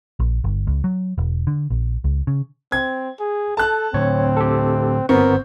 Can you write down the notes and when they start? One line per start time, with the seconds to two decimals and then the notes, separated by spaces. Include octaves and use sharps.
0.20 A#1
0.44 G1
0.67 C#2
0.84 F#3
1.18 E1
1.47 D3
1.70 A#1
2.04 C#2
2.27 C#3
2.72 C4 G#6
3.20 G#4
3.57 A4 A5 F#6
3.94 A2 D3 C4 C#5
4.37 G4 A4
5.09 G1 B3 C4 A#4 C#6